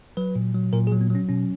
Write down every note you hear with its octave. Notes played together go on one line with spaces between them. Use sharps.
F#3 B4
A#2
F#3
A#2 A#4
G#4
F#3
B3
F#3 C#4
B2 C#4